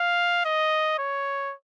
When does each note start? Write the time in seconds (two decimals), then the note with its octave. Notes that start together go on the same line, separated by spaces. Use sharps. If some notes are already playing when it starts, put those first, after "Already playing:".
Already playing: F5
0.45 D#5
0.98 C#5